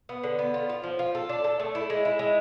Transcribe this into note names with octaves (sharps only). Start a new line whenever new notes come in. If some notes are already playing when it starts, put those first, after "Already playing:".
B3
D3
B3
F4
F4
F3
F4
A4
D4
A4
A3
E4
G#3
E4
G#3